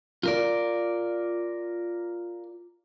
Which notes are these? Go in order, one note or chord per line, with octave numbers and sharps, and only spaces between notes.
F4 A#4 D5